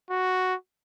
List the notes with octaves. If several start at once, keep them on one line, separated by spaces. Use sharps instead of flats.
F#4